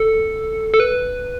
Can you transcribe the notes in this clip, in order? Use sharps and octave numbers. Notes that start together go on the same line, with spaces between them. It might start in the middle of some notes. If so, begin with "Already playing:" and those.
Already playing: A4
A4
B4